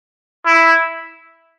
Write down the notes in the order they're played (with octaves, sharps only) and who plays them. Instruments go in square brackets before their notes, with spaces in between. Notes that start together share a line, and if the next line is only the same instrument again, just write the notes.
[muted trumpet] E4